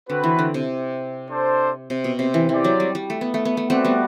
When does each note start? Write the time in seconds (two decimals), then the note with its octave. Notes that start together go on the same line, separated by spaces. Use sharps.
0.09 D3 C4 F#4 B4
0.24 E3
0.39 D3
0.54 C3
1.30 D4 A4 C5
1.90 C3
2.04 B2
2.19 C3
2.34 E3
2.49 E3 C4 G4 D5
2.64 F#3
2.80 G3
2.95 G3
3.10 A3
3.21 B3
3.34 A3
3.45 B3
3.57 A3
3.70 A3 C4 F#4 B4 D5 F#5
3.85 G3 B3